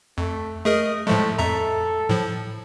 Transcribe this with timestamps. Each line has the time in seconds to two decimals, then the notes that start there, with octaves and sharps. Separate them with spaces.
0.18 F2 A3
0.65 A3 G#4 A#4 D#5
1.07 A2 F3 G#3 A3
1.38 F2 A4 E5 A#5
2.09 A2 F3